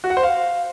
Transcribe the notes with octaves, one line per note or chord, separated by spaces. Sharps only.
F#4
F#5
C5
F5